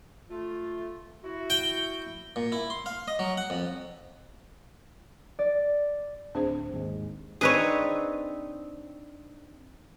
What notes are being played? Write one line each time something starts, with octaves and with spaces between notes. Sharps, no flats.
A3 F4
E4 F#4
G5
A#2
E4
C6
F5
D#5
F#3
F#5
F2
D5
D1 C4 D4 G#4 C5
G#1 D#2 G#3
C4 D4 D#4 G#4 B4 C#5